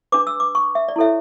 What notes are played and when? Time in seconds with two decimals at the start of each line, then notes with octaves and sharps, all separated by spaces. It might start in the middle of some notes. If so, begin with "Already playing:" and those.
0.12 D4 G#4 B4 D6
0.27 E6
0.40 D6
0.55 C#6
0.75 E5
0.88 D5
0.96 E4 A4 C#5 E5